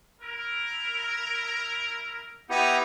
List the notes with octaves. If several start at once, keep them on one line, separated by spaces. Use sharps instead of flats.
E4 A#4
B3 D#4 E4 G4